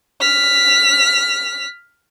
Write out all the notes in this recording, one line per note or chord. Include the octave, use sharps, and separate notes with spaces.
F6 B6